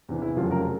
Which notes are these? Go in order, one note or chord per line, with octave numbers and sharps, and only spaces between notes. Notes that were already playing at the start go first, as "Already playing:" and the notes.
E2 C3 E3
E4
F1 F2 C#3 F#3 F4
A#4